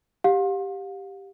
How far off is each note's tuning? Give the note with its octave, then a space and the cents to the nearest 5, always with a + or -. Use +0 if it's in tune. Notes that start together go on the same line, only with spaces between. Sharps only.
G4 +0 F5 +40